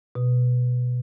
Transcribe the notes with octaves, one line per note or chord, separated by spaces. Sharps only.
B2